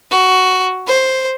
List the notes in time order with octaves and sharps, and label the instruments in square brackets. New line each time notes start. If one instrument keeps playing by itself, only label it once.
[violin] F#4
C5